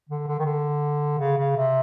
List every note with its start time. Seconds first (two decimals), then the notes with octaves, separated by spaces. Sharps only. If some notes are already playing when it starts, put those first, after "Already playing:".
0.09 D3
0.27 D3
0.39 D#3
0.45 D3
1.19 C#3
1.38 C#3
1.56 C3